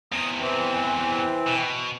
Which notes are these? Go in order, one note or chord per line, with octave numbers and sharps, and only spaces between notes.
E2 C3 D#6
E3 C4
B2